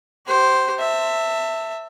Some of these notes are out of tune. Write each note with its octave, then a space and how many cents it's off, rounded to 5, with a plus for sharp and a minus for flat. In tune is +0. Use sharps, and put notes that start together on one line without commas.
G4 -35 C5 +0
E5 +0 A5 +30